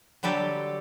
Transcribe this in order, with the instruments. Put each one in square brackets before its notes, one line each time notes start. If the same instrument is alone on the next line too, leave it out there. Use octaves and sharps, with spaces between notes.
[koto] D3 F#3 G3 G4 A4